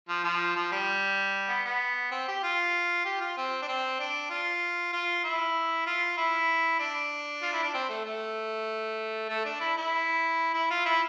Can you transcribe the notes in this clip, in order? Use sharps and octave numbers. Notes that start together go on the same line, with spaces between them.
F3
F3
F3
G3
B3
B3
C4
G4
F4
G4
F4
C4
D4
C4
D4
F4
F4
E4
F4
E4
D4
F4
E4
D4
C4
A3
A3
A3
D4
E4
E4
E4
F4
E4